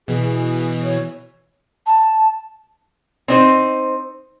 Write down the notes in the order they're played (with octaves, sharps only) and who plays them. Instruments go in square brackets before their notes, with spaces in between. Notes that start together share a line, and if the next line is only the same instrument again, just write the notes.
[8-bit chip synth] B2 E3 [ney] G#4
[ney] C#5
[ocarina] A5
[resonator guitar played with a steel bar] C4 D#4 C5